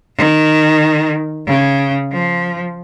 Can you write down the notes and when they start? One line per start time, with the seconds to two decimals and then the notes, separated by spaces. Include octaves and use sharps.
0.17 D#3
1.47 C#3
2.13 F3